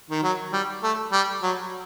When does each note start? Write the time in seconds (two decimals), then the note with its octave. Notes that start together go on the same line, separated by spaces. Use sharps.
0.10 D#3
0.23 F#3
0.52 G3
0.83 A3
1.12 G3
1.43 F#3